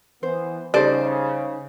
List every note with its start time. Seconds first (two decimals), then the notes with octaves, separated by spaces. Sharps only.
0.23 E3 B3 C5
0.74 C#3 G3 D#4 A4 C5 D5